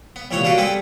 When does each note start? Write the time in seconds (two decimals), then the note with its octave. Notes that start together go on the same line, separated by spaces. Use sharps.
0.16 B3
0.31 A#1 C3 E3 B3 C#5 E5
0.44 A#3 D4 F#4 A4 B4
0.58 G3 B3 C4 G#4 A4 B4